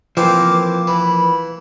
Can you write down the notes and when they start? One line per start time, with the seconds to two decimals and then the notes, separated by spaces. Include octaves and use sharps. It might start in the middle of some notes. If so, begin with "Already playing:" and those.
0.17 E3 F3 A#3 C4 D6
0.87 E3 B5